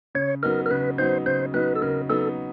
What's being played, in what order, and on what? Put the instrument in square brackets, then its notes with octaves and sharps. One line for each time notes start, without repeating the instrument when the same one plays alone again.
[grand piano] C#3 [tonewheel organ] C#5
[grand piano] F#3 B3 D#4 [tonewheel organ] A#4
[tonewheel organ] A#4
[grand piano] C#3 [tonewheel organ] B4
[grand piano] F#3 B3 D#4 [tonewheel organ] C5
[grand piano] C#3 [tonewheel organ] C5
[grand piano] F#3 B3 D#4 [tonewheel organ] B4
[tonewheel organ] A4
[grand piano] C#3 [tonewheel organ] A#4
[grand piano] F#3 B3 D#4 [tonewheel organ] A4